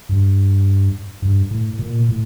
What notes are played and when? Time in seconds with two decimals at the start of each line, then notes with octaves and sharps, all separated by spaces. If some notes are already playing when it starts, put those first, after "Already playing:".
0.09 G2
1.22 G2
1.51 A2
1.79 A#2
2.09 A2